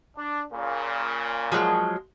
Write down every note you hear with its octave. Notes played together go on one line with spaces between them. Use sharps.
D4
A#2 C#3
F3 F#3 G#3